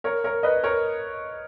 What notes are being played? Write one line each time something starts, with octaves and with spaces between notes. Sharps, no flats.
A#4 C#5
A#4 C#5
B4 D#5
A#4 C#5